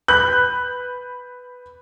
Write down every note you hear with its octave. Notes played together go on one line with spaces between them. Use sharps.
B4 B5 F#6 G6